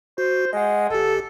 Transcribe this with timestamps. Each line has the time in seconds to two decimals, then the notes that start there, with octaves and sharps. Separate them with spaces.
0.18 F#4 C5
0.53 G#3 D#5 F#5
0.90 G1 G4 A4